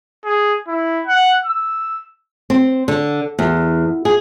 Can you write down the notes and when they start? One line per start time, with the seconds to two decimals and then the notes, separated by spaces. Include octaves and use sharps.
0.25 G#4
0.68 E4
1.07 F#5
1.45 E6
2.50 C4
2.88 D3
3.39 E2
4.05 G#4